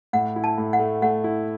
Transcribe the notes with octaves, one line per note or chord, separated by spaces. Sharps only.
A2 F#5
E4
A5
A2
F#5
A3
A3 F#5
E4